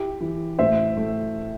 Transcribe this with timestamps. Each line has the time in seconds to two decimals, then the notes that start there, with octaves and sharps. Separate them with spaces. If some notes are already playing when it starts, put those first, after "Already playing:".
Already playing: E4 G4
0.21 E3
0.59 A2 C5 E5
0.97 A3